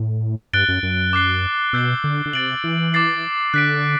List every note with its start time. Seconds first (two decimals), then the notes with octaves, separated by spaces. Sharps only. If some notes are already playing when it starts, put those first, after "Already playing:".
Already playing: A2
0.53 G2 F#6 A6 D7 G7
0.68 F#2
0.83 F#2
1.13 D6 F#6 C7 G7
1.73 B2 E6 G6 C7 G7
2.04 D3
2.26 D3
2.33 C3 A6 D7 F#7
2.64 E3
2.94 D6 A6 C7
3.54 D3 F#6 B6 D7